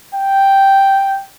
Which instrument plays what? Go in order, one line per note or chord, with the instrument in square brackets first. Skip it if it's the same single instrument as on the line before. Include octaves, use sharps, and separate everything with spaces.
[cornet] G5